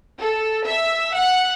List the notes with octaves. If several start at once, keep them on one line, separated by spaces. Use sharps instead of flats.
A4
E5
F#5